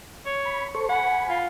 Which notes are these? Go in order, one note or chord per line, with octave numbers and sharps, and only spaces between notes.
C#5
B5
A4 C5 C#6
F#5 G#5 B5
F4